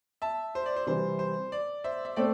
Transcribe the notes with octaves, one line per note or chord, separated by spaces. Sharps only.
E5 A5
C5
D5
C5
C3 E3 G3 C5
C5
D5
C5 E5
E5
A3 C4 D5 G5